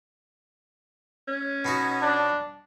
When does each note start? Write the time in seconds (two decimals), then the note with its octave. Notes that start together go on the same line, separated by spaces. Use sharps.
1.28 C#4
1.65 B2 D#4 F#4
2.02 D4